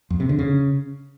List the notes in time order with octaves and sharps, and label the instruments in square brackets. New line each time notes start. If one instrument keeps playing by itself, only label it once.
[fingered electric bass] F2
C3
D3
C#3